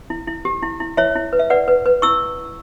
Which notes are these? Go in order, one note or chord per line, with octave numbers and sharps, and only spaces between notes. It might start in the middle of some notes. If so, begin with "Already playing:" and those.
E4
E4
G4
E4
E4
E4 C#5 E5
E4
B4
E5
B4 D5 F#5
B4
B4
E4 C#6 E6